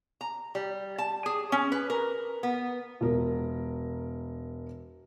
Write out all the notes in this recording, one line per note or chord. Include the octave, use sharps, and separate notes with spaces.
A#5
G3
A5
G#4
C#4
B4
A#4
B3
E1 A#4